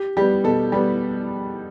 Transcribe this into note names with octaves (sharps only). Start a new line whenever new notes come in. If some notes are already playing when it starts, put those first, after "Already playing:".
Already playing: G4
G3 B3 G4
B2 A4
G3 B3